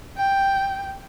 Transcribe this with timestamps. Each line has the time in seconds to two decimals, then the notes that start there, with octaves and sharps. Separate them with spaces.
0.17 G5